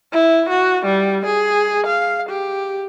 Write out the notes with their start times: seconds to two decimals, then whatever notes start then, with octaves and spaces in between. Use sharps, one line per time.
0.12 E4
0.49 F#4
0.85 G3
1.26 G#4
1.86 F5
2.29 G4